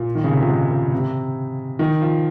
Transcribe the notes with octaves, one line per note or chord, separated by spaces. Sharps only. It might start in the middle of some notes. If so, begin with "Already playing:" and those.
Already playing: A#2
D#3
C#3
C3
A#2
G#2
A#2
C3
D#3
F3